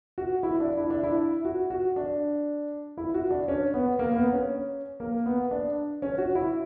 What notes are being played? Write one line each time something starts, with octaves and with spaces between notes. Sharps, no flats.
F#4
E4
D4
E4
D4
E4
F#4
F#4
D4
E4
F#4
D4
C#4
B3
A#3
B3
C#4
A#3
B3
D4
C#4
F#4
E4